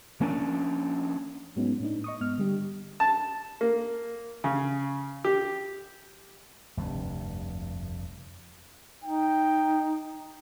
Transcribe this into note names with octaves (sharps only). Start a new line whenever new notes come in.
F3 A#3 C#4 D4
G#2 F#3 G#3 B3 C#4 D#4
A2 D4 D#4
D#5 C#6 D#6
G#2 B3 D#5 F6
D3 G3 G4
A5
A#3
C#3
G4
F1 D2 G2
D#4 G5